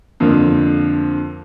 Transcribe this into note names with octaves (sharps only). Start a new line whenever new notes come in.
F2 D3 F3 A#3